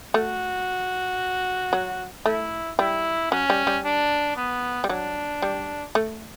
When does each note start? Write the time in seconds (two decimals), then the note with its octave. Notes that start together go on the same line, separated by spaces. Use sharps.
0.14 A3 F#4
1.73 F#3
2.26 A3 E4
2.79 G3 E4
3.31 F#3 C#4
3.50 G3
3.67 G3
3.85 D4
4.37 B3
4.84 G3
4.89 F#3 D4
5.42 G3
5.95 A3